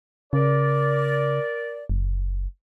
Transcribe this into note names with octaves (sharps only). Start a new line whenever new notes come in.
C#3 A#4 D5
F#1